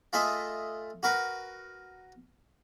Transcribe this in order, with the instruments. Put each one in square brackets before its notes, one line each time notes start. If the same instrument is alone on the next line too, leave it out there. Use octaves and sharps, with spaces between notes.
[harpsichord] A3 F4 G#4 D#5 E5
F#4 A#4 B4